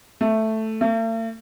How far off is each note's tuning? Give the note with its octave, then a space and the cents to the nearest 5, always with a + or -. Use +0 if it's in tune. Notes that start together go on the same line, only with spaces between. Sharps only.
A3 +0
A3 +45